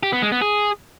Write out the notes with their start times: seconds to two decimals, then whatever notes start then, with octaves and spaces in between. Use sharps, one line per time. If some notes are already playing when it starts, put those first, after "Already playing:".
0.03 G4
0.13 B3
0.22 G#3
0.32 B3
0.42 G#4